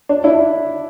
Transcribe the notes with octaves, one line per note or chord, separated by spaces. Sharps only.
D4
D4 E4